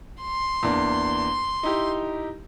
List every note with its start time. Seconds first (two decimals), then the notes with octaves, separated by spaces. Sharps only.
0.21 C6
0.63 E2 A#3 D4
1.63 D#4 E4 G4